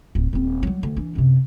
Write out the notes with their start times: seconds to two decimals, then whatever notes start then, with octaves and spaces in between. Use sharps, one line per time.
0.15 D1
0.33 D#1 C4
0.63 F#3 G3
0.83 D2
0.96 E3 D4
1.15 F#2 C3